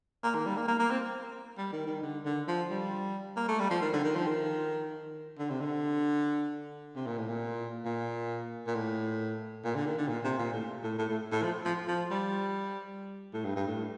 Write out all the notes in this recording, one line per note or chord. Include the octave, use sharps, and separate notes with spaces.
A#3
D#3
G3
A#3
A#3
A#3
C4
G3
D#3
D#3
D3
D3
F3
G3
A#3
A3
G3
F3
D#3
D3
D#3
F3
D#3
D3
C3
D3
C3
A#2
A2
A#2
A#2
A#2
A2
A#2
D3
D#3
D3
A#2
C3
A#2
A2
A2
A2
A2
A2
F3
F3
F3
G3
A2
G2
G2
A2